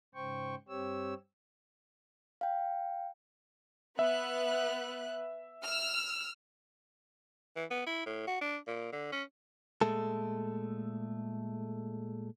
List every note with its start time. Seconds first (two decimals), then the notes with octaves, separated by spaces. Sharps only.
0.15 G#2 C#3 C5 G5 C#6
0.68 G2 C4 G4 C#5 E6
2.41 F5 G5
3.99 B3 B4 E5 F#6
5.64 E6 F6
7.56 E3
7.70 B3
7.87 E4
8.06 A2
8.27 F#4
8.41 D4
8.67 A#2
8.92 D3
9.12 C#4
9.81 A#2 G#3 A3 A4